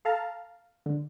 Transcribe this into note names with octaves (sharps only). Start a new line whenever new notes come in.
A4 F5 A5 A#5
D3